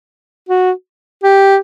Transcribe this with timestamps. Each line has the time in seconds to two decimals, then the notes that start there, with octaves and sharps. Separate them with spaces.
0.49 F#4
1.23 G4